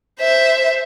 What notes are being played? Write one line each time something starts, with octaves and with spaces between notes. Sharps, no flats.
C5 E5